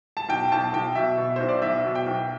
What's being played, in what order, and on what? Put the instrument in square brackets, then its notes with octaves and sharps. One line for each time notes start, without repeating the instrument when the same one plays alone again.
[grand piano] A5
B1 G5
B1 A5
B1 G5
B2 E5
B2
B1 C5
D5
B1 E5
B2
G5
B1